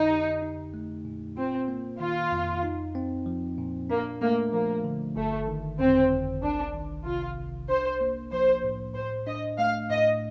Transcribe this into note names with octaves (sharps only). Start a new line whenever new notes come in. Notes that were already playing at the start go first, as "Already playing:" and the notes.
Already playing: F2 D3 D#4
G4
D#4
A3
A#2
C4 F4
A#3
D#3 F4
F2
D#4
C4
F3
A#2
A#3 D4
A3 A#3
F3 A#3
D3
G1 A3
D#3
F2 C4
G1
C2 D4
D#3
C3 F4
C2
D4 C5
A#3
F3 C5
A2
A2 C5
D4 D#5
A3 F5
A2 D#5